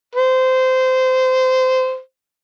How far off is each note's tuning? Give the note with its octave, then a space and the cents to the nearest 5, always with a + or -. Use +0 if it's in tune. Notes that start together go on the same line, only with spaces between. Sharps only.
C5 -20